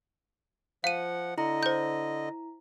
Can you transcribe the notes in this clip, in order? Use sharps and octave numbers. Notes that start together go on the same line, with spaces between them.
F3 F5 F#5 D#7
D3 E4 D#5 A#5
C5 G6